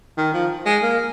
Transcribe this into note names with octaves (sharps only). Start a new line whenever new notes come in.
D#3
F3
G#3
A#3